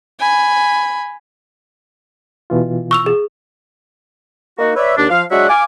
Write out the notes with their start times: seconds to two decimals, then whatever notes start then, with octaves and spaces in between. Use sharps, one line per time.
0.19 G#5 B5
2.50 B2 E3 F4
2.91 C#6 E6 F7
3.06 G#4
4.59 A#3 D#4 F#4
4.76 B4 C#5 D5 E5
4.96 D#2 D4
5.10 F3 F5
5.30 F#3 G#3 D4 F#4 E5 F#5
5.48 F5 G#5 D6